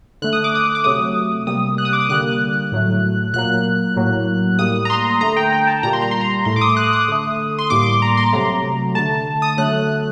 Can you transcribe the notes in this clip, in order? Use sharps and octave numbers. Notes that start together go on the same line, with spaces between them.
D3 A3 F#6
D#6
D6
D#6
D6
C3 F#3 A3 D#6
C3 G3 A#3 D#6
F#6
D#6
D6
D#6
D3 G3 A#3 F#6
A2 F#3 A3
A#2 F#3 A#3 F#6
A2 F#3 A#3
A2 G3 A#3 D#6
A#5
C6
D3 A3 A#5
G5
G5
A5
A#2 G3 A#3 A#5
C6
A#5
C6
A#5
A2 A3 C6
D6
D#6
F#6
D#6
D3 A3
C6
A2 G3 A#3 D6
C6
A#5
C6
C3 F#3 A3 A#5
D3 A3 A5
D#6
D3 F#3 A3 F#6